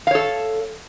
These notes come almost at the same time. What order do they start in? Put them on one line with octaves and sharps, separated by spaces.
F5 C#5 A4